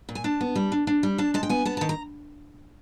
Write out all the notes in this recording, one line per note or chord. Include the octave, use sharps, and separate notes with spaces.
A#2
G#5
D4 A5
B3
G3
D4
D4
G3
D4 A5
G#3 A5
G5
B3 G#5
B3 A5
D#3 A5
A#5